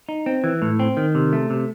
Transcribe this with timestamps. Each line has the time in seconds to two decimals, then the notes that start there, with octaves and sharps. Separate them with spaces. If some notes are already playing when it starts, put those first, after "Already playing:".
0.09 D#4
0.26 C4
0.44 E3
0.62 A2
0.80 C4
0.97 D#3
1.15 C3
1.33 A3
1.50 C3